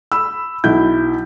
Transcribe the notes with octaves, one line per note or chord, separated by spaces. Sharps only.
B5 E6
B1 E4 G6